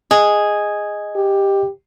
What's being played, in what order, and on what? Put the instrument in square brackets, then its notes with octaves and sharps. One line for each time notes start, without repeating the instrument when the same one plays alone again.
[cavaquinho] G#4 [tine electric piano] D#5
[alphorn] G4